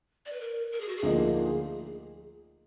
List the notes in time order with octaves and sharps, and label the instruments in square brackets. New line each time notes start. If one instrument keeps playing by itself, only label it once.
[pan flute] D5
B4
A#4
A#4
G#4
F#4
G#4
[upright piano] D2 D3 F3 A#3 D#4